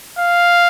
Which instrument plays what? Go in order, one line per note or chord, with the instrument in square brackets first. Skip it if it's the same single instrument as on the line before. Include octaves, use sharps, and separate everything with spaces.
[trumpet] F5